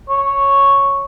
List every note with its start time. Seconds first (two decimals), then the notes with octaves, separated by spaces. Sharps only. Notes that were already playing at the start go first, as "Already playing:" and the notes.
0.09 C#5